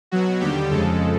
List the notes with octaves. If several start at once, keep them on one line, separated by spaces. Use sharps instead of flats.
B2 F#3 F#4
D#2 D3 G3 G4
F2 C#3 F3 G#3 A4